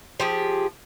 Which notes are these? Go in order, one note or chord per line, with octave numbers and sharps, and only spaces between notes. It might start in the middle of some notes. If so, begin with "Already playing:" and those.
F3 G4 G#4